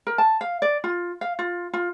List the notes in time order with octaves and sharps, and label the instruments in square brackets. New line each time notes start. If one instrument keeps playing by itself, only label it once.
[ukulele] A#4
A5
F5
D5
F4
F5
F4
F4